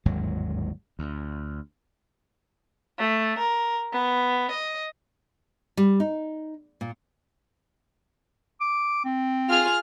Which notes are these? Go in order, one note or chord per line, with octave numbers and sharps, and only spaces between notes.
G1 D#2 G#2 F#3
D2
A3
A#4
B3
D#5
G3
D#4
A#2
D6
C4
F4 G#4 F6